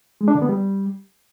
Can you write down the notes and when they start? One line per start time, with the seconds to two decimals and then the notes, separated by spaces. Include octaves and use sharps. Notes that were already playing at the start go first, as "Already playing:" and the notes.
0.21 G#3
0.28 D4
0.35 D3
0.42 B3
0.49 G3